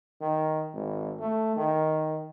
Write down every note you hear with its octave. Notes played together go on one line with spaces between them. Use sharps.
D#3
G#1
A3
D#3